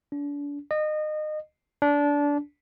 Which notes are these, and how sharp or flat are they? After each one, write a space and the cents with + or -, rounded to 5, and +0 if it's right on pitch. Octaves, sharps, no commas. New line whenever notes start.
D4 -35
D#5 -25
D4 -20